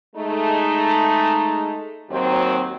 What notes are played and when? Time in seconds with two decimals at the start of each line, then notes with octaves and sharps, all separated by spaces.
0.16 G#3 A3 D#4
2.10 D#2 F#3 C4